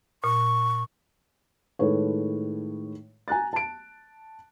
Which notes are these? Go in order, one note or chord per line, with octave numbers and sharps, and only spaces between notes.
A#2 C#6
A2 D#3 G#3 A4 B4 C#5
G#5 A#5 F#6 A6
A5 D7